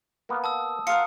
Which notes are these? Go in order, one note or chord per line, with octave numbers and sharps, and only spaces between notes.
A#3 B3
A5 D#6 E6
F4 A#4 F#5 D#6 C#7